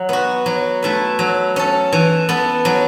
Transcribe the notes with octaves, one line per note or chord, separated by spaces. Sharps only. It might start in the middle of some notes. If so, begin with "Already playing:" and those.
Already playing: F#3
B3 F#4
F#3
A3 E4 B4
F#3
C#4 A4
E3
B3 A4
F#3